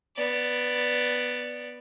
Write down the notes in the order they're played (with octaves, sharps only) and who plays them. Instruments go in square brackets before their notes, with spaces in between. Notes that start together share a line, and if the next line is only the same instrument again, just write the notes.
[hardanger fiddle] B3 D5